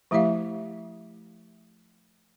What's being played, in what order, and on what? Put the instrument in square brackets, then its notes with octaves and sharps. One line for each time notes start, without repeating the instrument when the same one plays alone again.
[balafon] F3 A3 E4 G4 E5 F5